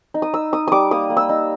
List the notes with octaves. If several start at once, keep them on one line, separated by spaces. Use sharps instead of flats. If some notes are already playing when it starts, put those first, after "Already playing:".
D#4
D#6
D#4 E6
D#4 D#6
G3 D6 D#6
A#3 D#6
A#3
E6
D#4